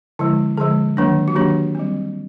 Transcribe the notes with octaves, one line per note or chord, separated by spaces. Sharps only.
D3 F3 G#3 E4
D3 F3 G#3 G#4
D#3 F#3 A#3 D4
F#4
D#3 F#3 A#3 D4 G4
G3 C4